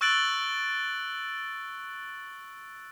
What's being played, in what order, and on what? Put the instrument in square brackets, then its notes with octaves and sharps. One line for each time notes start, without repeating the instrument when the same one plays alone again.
[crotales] C#6 E6 F#6 A6 D7 F#7